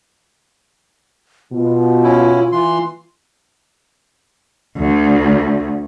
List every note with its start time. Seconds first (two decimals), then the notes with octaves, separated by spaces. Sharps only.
1.53 B2 F4
2.03 C#4 E4
2.52 E3 C6
4.77 D2